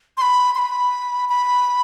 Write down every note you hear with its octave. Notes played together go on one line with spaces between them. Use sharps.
C6
B5
C6
B5
B5